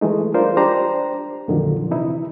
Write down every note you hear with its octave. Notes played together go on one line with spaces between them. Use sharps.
E3 G#3 A3 D#4
G3 D4 F4 A#4 C5 D5
D4 G4 C5 A#5
F2 A#2 D3 D#3 F3 F#3
C3 E3 D#4 E4